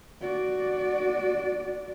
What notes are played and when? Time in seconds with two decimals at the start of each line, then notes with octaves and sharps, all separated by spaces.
0.21 F#4 D5